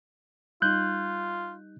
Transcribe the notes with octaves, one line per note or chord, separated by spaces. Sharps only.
G3 D#4 F4 F#6 G6